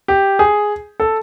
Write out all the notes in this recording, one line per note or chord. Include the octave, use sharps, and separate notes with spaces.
G4
G#4
A4